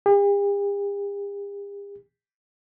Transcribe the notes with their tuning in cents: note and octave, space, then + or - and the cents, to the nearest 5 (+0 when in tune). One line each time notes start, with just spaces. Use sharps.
G4 +45